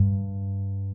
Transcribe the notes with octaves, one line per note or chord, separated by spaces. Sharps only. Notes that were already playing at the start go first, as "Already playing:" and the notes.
Already playing: G2